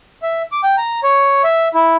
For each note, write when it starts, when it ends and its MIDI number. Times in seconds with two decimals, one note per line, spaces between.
0.23 0.42 76
0.52 0.61 86
0.63 0.75 79
0.78 1.00 82
1.04 1.42 73
1.44 1.68 76
1.74 1.96 64